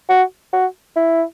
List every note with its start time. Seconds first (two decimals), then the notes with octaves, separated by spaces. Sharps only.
0.10 F#4
0.53 F#4
0.96 E4